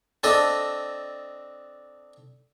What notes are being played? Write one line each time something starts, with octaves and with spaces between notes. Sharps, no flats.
C4 D4 A4 D#5